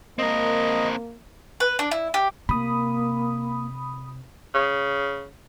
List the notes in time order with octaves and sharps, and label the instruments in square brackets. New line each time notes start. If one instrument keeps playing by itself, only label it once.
[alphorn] A#3 [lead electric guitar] C4 A#4 [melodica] D#5
[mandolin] B4
D4
E4
G4
[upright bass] C3 [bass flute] A#3 [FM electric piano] B5 D#6
[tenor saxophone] C#3